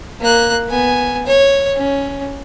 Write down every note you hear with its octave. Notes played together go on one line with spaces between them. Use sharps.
A#3 F#6
B3 G#5
C#5
C#4